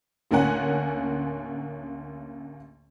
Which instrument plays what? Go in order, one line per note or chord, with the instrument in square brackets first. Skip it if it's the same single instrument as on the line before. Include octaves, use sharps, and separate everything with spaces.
[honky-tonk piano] A1 D2 A#3 C#4 F#5 G#5